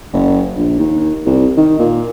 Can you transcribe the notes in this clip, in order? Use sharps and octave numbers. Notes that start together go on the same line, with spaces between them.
F#1
A#1
D#2
C2
D#3
A#2